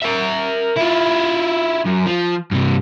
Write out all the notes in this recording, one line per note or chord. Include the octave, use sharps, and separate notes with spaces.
A#4 E5
E4 F4
F#2
F3
G2 C3